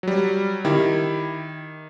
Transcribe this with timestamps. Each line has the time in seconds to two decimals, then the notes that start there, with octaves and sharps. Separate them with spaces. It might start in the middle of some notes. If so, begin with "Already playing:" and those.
0.03 F#3 G3
0.65 D#3 E4 G4